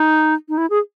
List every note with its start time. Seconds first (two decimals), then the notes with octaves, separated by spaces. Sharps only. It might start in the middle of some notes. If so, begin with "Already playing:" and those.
Already playing: D#4
0.49 D#4
0.58 E4
0.70 G#4